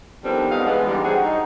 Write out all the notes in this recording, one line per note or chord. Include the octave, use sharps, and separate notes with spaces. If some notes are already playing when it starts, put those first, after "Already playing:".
D3 D#3 F3 G3 B3 C4
G#3 B3 D4 D#4 C#5 F5
E3 G#3 B3
G#2 D3 E3 G3
D3 F#3 C4 F#4 G#4
D#4